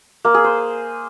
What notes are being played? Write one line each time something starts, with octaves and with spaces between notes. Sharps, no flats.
A#3
G#4
C5